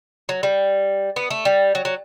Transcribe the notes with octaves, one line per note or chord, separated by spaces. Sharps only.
F#3
G3
B3
A3
G3
F#3
F#3